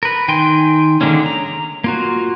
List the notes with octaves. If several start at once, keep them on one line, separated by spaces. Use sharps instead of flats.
A#4 B4
D#3 G5 G#5 C6
D3 D#3 G#3 A#3 C#4
A#5
A#3 F4 F#4